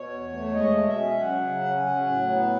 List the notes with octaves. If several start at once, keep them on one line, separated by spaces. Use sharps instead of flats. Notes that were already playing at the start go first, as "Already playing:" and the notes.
Already playing: B2 C#5
E2
A3
G#3 D#5
B2
E5
C#4
F#3 F#5
C#3
C#4
F#3
A2
B3